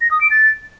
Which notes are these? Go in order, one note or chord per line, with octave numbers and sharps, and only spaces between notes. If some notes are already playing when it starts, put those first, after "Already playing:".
A#6
D#6
D7
A6